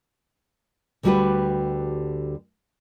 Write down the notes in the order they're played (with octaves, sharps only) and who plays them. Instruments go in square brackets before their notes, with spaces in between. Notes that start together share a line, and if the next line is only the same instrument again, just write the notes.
[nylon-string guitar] D2 D3 G3 F#4 G4 B4